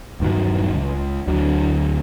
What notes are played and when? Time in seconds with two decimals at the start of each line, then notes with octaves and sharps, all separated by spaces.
0.20 D#1 G2 D#3 F#3
0.72 C#2
1.27 D2 D3 F#3